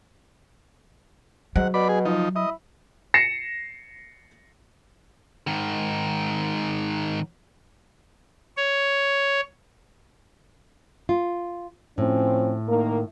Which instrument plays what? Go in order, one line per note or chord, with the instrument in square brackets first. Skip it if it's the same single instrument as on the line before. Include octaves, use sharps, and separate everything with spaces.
[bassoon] G#2 [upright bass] F#3 [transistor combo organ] F#5
[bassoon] B2 [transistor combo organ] D5 B5
[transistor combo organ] G#4
F3 D#4
[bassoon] E4 [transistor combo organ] D#5
[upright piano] A#6 C7 C#7 E7
[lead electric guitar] G#2 D#3
[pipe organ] C#5
[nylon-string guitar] F4
[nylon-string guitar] A2 [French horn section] F3 C4 C#4
[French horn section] D#3 A#3 A#4